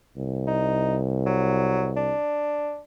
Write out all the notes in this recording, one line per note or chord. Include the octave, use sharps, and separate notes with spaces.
C2
D#4
F#3
D4